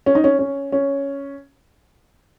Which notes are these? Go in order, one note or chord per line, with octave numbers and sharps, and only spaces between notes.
C#4
D#4
C#4
C#4
C#4